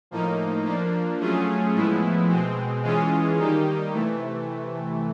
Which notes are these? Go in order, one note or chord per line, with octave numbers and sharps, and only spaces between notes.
A2 F3 A#3 D#4
F3 A#3 D4
F#3 A3 C#4 F4 G#4
A2 F3 G#3 B3 E4
B2 G#3 C4
E3 G#3 C#4 F4 G#4
D#3 G3 A#3 D#4 G4
C3 E3 A3